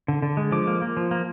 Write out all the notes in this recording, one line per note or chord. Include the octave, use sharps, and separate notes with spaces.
D3
D3
G#3
F3 D6
A#3
A#3
F3
A#3